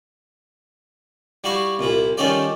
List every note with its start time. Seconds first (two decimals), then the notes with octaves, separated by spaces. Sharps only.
1.44 G3 E4 F#4 F5 C#6
1.79 C2 A#2 E4
2.17 D#3 G3 C#4 F4 A4 D5